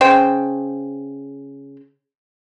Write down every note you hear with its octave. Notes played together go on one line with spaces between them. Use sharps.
C#3 C5 G5